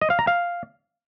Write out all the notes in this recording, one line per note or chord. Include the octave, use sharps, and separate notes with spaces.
D#5
F5
A#5
F5